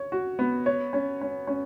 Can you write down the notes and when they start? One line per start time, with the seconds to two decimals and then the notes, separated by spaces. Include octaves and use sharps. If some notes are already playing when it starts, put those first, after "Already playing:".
Already playing: C#5
0.12 F#4
0.39 B3
0.66 C#5
0.93 C#4
1.21 C#4
1.47 C#4